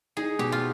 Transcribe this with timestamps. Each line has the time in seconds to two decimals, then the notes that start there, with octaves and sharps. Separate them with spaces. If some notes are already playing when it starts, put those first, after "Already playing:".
0.17 D#4 G#4
0.39 B2 G4
0.52 F4